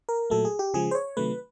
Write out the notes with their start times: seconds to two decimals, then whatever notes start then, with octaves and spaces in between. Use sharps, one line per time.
0.09 A#4
0.30 A#2 F#3 A3 A4
0.45 G#4
0.59 G4
0.74 C#3 F3 G#3 G#4
0.91 C5
0.95 C#5
1.17 C3 D#3 F#3 A3 B4